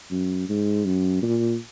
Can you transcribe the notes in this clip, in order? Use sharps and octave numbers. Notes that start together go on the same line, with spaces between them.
F#2
G#2
F#2
A#2